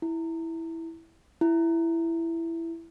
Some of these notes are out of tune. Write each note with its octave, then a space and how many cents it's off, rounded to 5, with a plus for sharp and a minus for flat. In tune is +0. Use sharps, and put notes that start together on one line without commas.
E4 -5
E4 +10